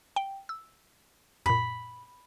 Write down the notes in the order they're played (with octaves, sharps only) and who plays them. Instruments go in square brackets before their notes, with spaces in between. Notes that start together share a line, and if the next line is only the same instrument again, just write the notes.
[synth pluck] G5
E6
[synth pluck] F#2 A#2 [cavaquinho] B5